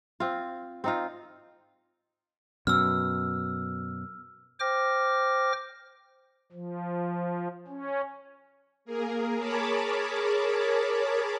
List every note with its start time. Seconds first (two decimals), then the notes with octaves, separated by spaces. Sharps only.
0.20 C4 F4
0.84 C4 D#4 F4
2.67 F#2 B2 E6 F6
4.60 C5 G5 D6 F6 A#6
6.52 F3
7.68 C#4
8.85 A#3 G#4 A#4
9.37 G#4 A#4 C#5 A5 B5 D6